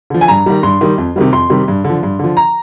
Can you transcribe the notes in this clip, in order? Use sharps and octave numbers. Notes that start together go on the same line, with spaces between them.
D3 F3
G#5
G2 A#5
D#3 G3
G2 C6
D#3 G3
F2
C3 D#3 G3
F2 C6
C3 D#3 G3
G2
D3
F3
G2
D3 F3
A#5